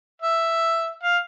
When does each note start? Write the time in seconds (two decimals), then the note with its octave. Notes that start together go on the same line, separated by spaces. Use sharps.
0.22 E5
1.03 F5